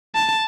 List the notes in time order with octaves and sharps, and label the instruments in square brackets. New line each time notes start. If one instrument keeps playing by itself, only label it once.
[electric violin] A5